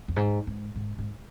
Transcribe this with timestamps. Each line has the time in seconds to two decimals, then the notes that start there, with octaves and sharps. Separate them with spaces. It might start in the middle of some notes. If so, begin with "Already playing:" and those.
0.08 F2
0.16 G#2
0.47 G#2
0.76 G#2
0.98 G#2